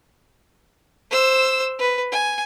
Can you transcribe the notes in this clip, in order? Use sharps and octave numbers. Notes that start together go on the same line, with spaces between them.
C5 E6
B4
G#5